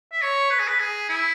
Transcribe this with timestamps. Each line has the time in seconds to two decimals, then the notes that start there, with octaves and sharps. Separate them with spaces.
0.12 E5
0.22 C#5
0.51 B4
0.60 G#4
0.68 B4
0.80 G#4
1.09 E4